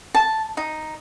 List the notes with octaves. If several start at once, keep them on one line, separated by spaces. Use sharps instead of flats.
A5
D#4